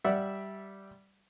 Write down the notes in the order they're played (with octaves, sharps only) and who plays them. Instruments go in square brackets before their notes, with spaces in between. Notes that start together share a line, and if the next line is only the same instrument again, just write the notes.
[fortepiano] G3 D5 E5 F#5